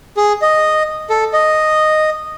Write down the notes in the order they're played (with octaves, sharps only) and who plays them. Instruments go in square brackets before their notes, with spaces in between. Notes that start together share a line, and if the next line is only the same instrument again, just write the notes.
[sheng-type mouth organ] G#4
D#5
A4
D#5